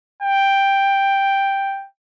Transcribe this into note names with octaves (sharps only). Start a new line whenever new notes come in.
G5